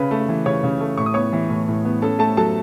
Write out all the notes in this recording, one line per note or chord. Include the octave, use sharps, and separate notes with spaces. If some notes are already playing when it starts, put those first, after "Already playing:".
Already playing: C#3 C#4 B4 B5
A3
E3
C#3 C#5 C#6
C#3
A3
A2 C#6
D#6
B3 C#5 C#6
E3
A2
A2
B3
C#4 A4 A5
A3 A4 A5
F#3 A4 A5